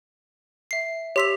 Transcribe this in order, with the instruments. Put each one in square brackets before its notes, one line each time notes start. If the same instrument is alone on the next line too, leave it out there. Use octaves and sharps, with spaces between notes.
[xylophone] E5 C7
[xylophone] G4 B6 F7 [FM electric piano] C#5 C6 E6